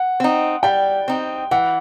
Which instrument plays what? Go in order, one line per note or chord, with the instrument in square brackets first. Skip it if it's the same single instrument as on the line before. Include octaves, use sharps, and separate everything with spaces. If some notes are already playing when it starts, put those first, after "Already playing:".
Already playing: [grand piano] F#5
[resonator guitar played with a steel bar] C4 D#4
[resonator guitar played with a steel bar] G3 [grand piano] G5
[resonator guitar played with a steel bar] C4 D#4
[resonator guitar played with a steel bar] E3 [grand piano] F#5